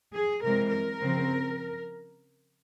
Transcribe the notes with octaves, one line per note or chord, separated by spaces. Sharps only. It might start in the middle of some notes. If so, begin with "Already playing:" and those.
G#4
C3 E3 G#3 C4 A#4
A#4
C#3 F3 C4